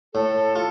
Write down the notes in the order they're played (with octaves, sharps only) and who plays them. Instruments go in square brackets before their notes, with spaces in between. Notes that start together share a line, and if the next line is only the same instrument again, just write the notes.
[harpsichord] A2 [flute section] A4
[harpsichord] F4